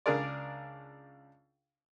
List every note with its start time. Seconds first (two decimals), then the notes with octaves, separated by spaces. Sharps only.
0.06 C#2 D4 G#4 A#4 D5